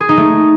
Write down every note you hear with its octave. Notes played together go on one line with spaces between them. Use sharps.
G#4
D#4
A3